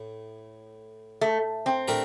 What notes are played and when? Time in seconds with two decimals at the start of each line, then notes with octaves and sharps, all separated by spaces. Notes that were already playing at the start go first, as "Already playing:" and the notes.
Already playing: A2
1.21 A3
1.66 C4
1.88 A3 D4 G4 A#4